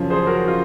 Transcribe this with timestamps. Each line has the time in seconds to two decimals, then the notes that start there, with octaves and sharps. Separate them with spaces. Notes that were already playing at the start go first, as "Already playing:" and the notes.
Already playing: F#2 C#3 F3
0.10 G#4 C5
0.27 F#4 A#4
0.47 F4